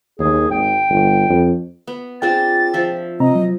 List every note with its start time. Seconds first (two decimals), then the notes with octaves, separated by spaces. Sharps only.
0.19 D#2 G#4
0.51 G#1 G5
0.89 G1
1.29 F2
1.87 B3
2.22 C4 D4 F4 G#4 G5 A6
2.74 F3 E5
3.20 C3 C4 D#5 A#5
3.35 F#3